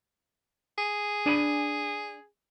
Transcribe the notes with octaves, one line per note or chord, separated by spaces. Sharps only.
G#4
D4 G#5 B5